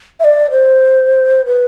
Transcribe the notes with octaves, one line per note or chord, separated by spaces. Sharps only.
E5
D5
C5
B4